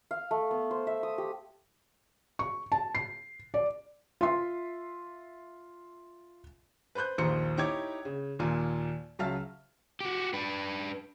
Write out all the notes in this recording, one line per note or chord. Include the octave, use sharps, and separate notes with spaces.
F5
A3
B3
C5
E5
D#6
G4
C#6
A5
C7
D5
F4 E5 C6
B4 C5 B5 F#6 G6
A#1 D#2 F4 C5 A#5 C#7
D#4 E4 G4 C#5 D6 G#6
C#3
D#2 A#2 A#3 F4 G#5
C#2 F#3 E5 F5 A5 F6
F#4 G4
D4 B4